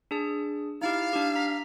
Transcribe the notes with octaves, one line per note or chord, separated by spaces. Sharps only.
D4 G#4 A5
D#4 E4 G4 F5
D4 G4
A#5 B6